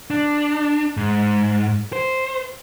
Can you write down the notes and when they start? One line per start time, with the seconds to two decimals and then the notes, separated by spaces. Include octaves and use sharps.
0.10 D4
0.97 G#2
1.93 C5